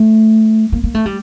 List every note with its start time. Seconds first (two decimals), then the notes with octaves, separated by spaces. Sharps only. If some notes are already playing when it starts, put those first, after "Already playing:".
Already playing: A3
0.72 A#3
0.84 A#3
0.94 A3
1.06 G3